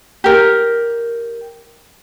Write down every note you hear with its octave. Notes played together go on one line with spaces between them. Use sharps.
G4 A#4